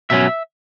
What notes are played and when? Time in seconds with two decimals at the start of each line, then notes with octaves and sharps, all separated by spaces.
0.10 B2 F#3 C#4 E5